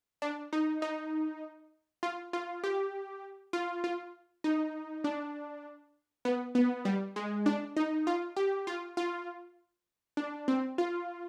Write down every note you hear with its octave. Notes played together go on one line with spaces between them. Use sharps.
D4
D#4
D#4
F4
F4
G4
F4
F4
D#4
D4
B3
B3
G3
G#3
D4
D#4
F4
G4
F4
F4
D4
C4
F4